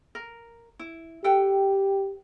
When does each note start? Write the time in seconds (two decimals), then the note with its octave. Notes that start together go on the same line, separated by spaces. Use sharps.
0.15 A#4
0.79 E4
1.24 G4 A4 B4 G5